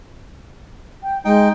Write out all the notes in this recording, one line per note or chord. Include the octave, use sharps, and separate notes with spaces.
G5
G#3 D#4 G5